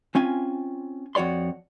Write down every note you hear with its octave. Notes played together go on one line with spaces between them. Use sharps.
C4 C#4 F4 G#5
F2 F#4 C#5 D5 C6